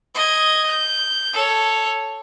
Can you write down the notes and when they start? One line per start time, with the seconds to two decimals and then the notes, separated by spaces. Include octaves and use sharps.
0.15 D#5 G#6
0.67 G6
1.33 A4 C#5